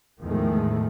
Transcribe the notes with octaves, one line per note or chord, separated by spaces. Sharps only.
E2 A2 D#3 F3 G#3 A3